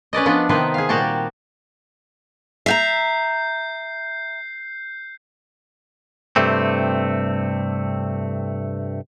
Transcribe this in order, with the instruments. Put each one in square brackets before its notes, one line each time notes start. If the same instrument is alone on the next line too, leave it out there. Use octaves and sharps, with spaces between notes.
[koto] C#4 B4 D5 D#5
F3 B3 D4
C3 D#3 B3 C4 B4
G#4 F5
A#2 G3 F#4 G4 A5
[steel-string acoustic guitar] E5 F5 A#5 [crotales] G6 C7
[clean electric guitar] G2 C3 A3 C4